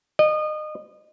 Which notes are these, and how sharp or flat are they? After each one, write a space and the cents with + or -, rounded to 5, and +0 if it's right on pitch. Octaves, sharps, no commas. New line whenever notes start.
D#5 -30